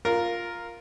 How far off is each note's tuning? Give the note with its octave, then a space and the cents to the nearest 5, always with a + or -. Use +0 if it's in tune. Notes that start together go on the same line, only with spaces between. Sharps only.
F4 +0 A#4 +0